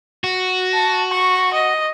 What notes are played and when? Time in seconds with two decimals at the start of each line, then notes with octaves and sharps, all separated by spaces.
0.24 F#4
0.74 A5
1.12 C#6
1.54 D#5